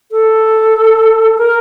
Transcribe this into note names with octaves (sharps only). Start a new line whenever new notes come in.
A4
A#4